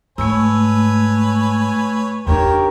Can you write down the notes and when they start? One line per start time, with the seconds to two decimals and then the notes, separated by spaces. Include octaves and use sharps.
0.18 G#2 A3 B4 C#5 G#5 E6
2.27 E2 D#3 D4 G4 A#4 C#5